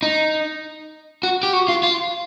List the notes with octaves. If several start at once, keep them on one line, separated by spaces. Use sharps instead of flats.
D#4
F#4
G4
F#4
F4
F4